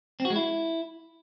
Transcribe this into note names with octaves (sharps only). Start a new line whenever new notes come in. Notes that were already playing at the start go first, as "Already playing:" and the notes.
C4
F#4
G#3
E4